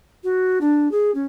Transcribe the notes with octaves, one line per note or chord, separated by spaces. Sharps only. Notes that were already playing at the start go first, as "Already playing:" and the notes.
F#4
D4
G#4
C#4